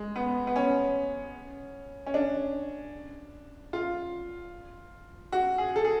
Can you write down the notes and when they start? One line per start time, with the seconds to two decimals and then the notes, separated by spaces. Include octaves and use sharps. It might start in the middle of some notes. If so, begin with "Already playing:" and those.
Already playing: G#3
0.16 B3
0.47 B3
0.56 C#4
2.06 C#4
2.14 D4
3.73 F4
5.32 F#4
5.58 G#4
5.76 A4
5.85 G#4